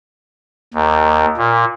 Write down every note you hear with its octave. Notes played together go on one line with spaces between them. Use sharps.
D#2
A#2